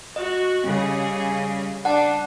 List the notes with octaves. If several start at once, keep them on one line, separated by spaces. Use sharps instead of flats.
F#4 D#5
C#3 G3 G#4
D4 F#5 A5